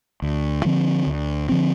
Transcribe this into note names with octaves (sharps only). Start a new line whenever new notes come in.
D2
D3 F3 C4
D2
D3 F3 C4